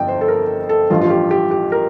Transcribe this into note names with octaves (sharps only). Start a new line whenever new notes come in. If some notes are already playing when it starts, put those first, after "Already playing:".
Already playing: G1 F2 F3 G5
C5
A4
A#4
A4
A1 G2 F3 F4
F4
G4
G4
G4
A#4